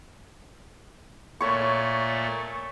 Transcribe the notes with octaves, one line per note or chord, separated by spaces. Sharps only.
A#2 A3 C#5 C#6